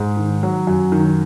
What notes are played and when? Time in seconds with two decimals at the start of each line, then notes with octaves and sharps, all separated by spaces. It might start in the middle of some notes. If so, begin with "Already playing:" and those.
Already playing: G#2
0.17 D#3
0.43 F#3
0.67 F#2
0.92 D#3